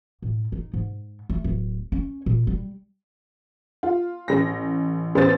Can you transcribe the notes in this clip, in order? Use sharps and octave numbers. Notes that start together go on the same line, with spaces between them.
A2
D#4
G#2
A3
D1
C#4
A#2
G3
F4
A1 A#6
A1 B3 C5 A6